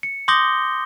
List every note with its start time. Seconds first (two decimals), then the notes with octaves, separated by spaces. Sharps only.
0.03 C#7
0.28 C6 D6 D#6 G6 A#6 G7